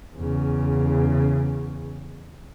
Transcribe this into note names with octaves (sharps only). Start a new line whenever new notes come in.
E2 C#3